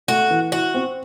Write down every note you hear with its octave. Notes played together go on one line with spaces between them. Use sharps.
A3 F#4
E3
E4 F#4
C4